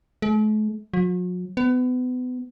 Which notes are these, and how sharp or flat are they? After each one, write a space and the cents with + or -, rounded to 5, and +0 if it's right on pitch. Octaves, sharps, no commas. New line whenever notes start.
A3 -45
F#3 -45
B3 +30